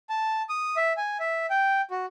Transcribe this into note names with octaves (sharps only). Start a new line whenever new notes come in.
A5
D#6
E5
G#5
E5
G5
F#4